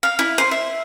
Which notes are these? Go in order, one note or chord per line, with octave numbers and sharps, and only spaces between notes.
F5
E4
C5
E5